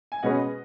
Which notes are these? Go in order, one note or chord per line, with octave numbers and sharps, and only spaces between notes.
G#5
B2 G#3 C#4 G#4 B4 D#5 F#5